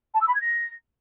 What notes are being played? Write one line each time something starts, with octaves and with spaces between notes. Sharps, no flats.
A5
E6
B5
G#6
A#6